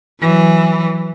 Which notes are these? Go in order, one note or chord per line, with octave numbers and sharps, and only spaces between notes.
E3 F#3